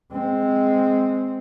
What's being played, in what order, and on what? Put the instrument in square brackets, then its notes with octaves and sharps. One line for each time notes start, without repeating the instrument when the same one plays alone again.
[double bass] G#3 C4